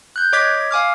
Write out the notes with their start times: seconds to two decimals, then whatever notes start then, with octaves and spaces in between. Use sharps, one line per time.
0.16 F#6 G6
0.33 C#5 D#5 D6 G#6 B6
0.71 F5 G#5 D6 F6